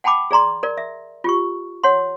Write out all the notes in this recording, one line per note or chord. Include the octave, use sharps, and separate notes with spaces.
F#5 G5 A5 B5 D6
G#4 D5 A#5 C6
A#4 D5
E5
F4 G4 C#6
C#5 F#5 C6